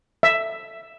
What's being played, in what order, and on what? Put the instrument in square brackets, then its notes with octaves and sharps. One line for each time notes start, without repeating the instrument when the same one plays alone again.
[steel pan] E5